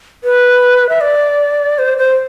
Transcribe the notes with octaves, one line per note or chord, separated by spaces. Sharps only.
B4
E5
D5
C5
C5